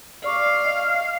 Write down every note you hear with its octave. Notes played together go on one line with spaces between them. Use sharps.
D5 F5 C#6 D6
D#5